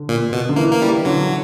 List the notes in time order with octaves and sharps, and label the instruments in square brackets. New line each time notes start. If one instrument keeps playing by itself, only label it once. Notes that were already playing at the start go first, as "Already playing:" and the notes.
Already playing: [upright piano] D3
[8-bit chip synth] A#2
B2
[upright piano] D3
[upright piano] E3 [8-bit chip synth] A#3
[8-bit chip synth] A#3
[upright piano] E3 [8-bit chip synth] G3
[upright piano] E3
[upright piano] D3 [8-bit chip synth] F#3